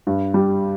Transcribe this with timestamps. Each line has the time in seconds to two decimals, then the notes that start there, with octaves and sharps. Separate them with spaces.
0.07 G2
0.34 G3